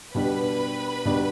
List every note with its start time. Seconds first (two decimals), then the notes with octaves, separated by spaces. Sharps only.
0.14 B2 G3 D4 B4 B5
1.05 B2 G3 D4